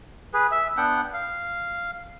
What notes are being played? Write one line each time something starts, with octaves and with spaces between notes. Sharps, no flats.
G#4 B4
E5
B3 D4 F#5 G5
F5